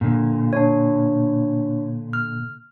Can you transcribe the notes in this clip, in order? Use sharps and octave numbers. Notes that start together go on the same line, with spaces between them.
A#2 D3
D4 C#5
F6